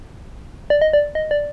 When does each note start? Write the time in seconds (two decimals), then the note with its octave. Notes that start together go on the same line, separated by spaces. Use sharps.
0.70 D5
0.81 D#5
0.93 D5
1.15 D#5
1.31 D5